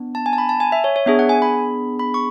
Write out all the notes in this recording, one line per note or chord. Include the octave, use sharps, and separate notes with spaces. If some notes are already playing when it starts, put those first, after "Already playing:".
Already playing: B3 D4
A5
G#5
A5
B5
A5
G#5
E5
C#5
C#5
B3 D4 G#4 E5
F#5
G#5
B5
B5
C#6